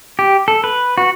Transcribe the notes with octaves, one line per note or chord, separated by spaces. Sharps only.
G4
A4
B4
F#4